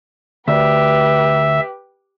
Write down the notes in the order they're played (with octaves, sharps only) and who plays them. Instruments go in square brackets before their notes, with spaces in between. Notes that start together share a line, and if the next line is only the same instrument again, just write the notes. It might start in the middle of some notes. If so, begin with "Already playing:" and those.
[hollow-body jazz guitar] D2 [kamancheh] G4 B4 [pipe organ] E5